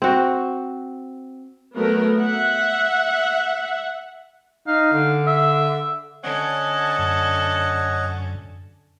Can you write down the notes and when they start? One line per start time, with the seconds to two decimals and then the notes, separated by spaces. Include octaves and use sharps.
0.02 C4 F#4
1.76 F#3 A3 B3 A#4
2.19 E5 F#5
4.67 D#4 F5
4.93 D3
5.27 E5
6.23 D3 C#4 C#5 D#5 F#5 A5
6.99 F#2